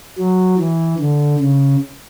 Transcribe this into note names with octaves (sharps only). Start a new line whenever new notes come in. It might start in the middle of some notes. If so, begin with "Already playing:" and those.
F#3
E3
D3
C#3